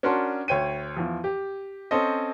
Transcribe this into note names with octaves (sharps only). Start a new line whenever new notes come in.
C#4 D4 F#4 A#4 A5 C6
D2 C#5 G5 D#7
E2 F3
G4
C4 C#4 A4 C5 D#5